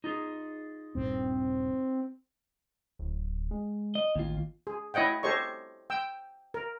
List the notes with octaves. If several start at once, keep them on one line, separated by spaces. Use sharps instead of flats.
D#4 F4 G#4
D#1 G2 A#2 C4
D1
G#3
D#5
A1 D#2 F4
G#4
E4 C#5 D#5 F#5 G5
G4 A4 C5 C#5 D#5 C#6
G5 E6
A#4